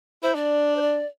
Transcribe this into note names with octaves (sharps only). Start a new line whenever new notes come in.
E4 C5
D4 D5
C5
D5